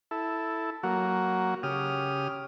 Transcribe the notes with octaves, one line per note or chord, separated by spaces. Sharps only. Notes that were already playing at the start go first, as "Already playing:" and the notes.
E4 A4
F#3 A#3 F#4
C#3 G4 D#6 F6